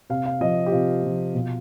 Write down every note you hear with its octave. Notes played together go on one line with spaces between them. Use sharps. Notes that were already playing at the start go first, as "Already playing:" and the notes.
C3 F5
F5
F3 D#5
G4
C3 F4
F3
B2